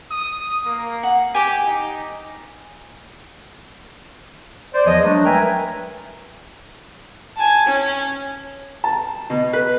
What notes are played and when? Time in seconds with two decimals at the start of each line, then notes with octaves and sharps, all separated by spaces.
0.10 D#6
0.65 A#3
1.03 F#5
1.34 G4 G#5 D6
1.66 D#4
4.74 C5 D5
4.85 E2 E3 F3 C#5 D#5
5.03 F#3 G#3 A3 D4
5.24 A#4 B4 E5 G5 G#5 A#5
7.37 G#5 A5
7.67 C#4
8.84 A5
9.30 B2
9.53 B4